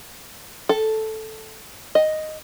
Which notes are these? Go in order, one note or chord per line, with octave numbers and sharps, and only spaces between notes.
A4
D#5